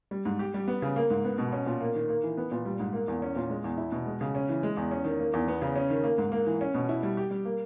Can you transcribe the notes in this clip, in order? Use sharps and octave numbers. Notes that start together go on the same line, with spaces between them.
G3
G#2
G4
G3
B3
C#3
A#3
G#2
B3
B2
C#4
A#2
A#3
D#3
A#3
E3
B3
A#2
G3
G#2
A#3
E2
C#4
A#2
G#3
E2
E4
B2
G#3
C#3
C#4
E3
G#3
E2
C#4
D#3
A#3
E2
B3
C#3
C#4
D#3
A#3
G#2
A#3
E3
C#4
B2
E4
G3
G4
G3
A#3